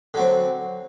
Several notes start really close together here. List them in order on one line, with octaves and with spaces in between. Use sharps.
D3 F#3 C4